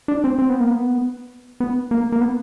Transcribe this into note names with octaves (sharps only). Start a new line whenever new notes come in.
D4
C4
C4
B3
A#3
B3
B3
A#3
A#3
B3